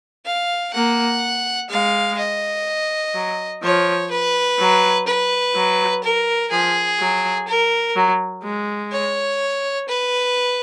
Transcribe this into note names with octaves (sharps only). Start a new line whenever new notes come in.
F5
A#3 F#5
G#3 F5
D#5
F#3
F3 C#5
B4
F#3
B4
F#3
A#4
F3 G#4
F#3
A#4
F#3
G#3
C#5
B4